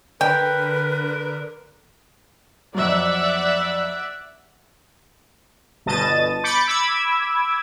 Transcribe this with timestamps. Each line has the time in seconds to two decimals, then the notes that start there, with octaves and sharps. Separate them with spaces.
0.21 D3 A#4 B4 G5
2.74 F2 F#3 D5 E5 F#5
5.86 G1 B2 D#5 A5 A6 D#7
6.44 B5 D6 G6 A6 C#7
6.66 B5 D6 E6 G#6